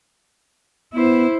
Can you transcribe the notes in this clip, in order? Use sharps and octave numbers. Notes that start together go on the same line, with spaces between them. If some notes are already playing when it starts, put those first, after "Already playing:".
B3 E4 C5